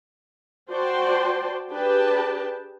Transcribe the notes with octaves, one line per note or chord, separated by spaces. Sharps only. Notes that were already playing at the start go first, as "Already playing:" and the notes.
F#4 C5 D5 G5 A5 C6
D4 G4 G#4 B4 G5 A5